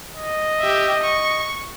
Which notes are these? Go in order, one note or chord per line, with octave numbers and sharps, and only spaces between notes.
D#5
G4 E5
C#6